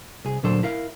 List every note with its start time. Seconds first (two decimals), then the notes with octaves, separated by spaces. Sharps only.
0.25 C2 G#4
0.43 D2 A#2 F#3 D4 A4 C5
0.63 E4 A#4 F5